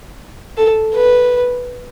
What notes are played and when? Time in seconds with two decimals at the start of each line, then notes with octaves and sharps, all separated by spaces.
0.57 A4
0.94 B4